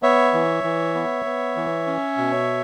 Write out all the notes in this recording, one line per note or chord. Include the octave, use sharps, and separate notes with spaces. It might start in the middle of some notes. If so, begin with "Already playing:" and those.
B3 C#5 E5
E3
E3
B3
B3
E3
C#4
B2